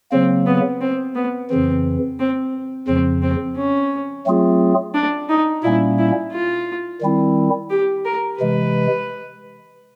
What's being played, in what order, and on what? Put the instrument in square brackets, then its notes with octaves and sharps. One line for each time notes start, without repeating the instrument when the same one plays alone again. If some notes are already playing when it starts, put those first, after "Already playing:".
[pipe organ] C#3 F#3 A#3 [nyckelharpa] C4
[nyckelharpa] B3
C4
B3
[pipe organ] F2 C#3 E3 [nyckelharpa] C4
[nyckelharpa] C4
[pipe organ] F2 C#3 F3 [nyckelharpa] C4
[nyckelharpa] C4
C#4
[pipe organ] F#3 A3 C4 F4 G#4
[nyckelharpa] D4
D#4
[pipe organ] A#2 G3 A#3 C#4 [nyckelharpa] E4
[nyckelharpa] E4
F4
[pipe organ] D#3 G3 C4 E4
[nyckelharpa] G4
A#4
[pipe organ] C3 E3 G#3 [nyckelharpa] B4